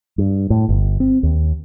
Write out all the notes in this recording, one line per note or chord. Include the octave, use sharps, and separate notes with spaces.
G2
A2
G1
C4
D#2